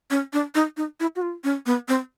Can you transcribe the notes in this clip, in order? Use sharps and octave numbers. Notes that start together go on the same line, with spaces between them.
C#4
D4
D#4
D#4
E4
F#4
F4
C#4
B3
C4